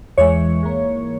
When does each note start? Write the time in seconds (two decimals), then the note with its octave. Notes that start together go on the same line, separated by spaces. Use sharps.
0.18 E2 E3 G#3 C#5
0.63 G#2 E3 A#3